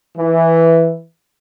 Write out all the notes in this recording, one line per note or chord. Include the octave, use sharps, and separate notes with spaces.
E3